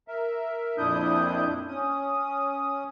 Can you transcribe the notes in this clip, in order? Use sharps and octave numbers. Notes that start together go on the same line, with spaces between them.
A#4 E5
F2 A#2 D4 E4 D#6 G6
C#4 D#6